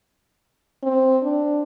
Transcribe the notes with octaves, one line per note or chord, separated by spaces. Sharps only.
C4
D4